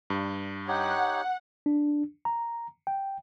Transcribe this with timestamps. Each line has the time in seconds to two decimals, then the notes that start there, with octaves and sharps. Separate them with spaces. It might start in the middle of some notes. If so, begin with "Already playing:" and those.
0.10 G2
0.68 D#4 G4 C#5 F#5
1.66 D4
2.25 A#5
2.87 G5